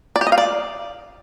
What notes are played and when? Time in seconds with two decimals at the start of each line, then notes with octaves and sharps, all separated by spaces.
0.16 D5
0.21 G4
0.27 D#5
0.32 F5
0.38 D5